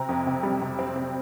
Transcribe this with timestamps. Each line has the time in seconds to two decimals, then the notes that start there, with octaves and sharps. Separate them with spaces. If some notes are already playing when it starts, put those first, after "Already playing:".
Already playing: C3 C4 A#5
0.09 F2
0.26 C3
0.43 G3
0.61 C3
0.79 C4
0.96 C4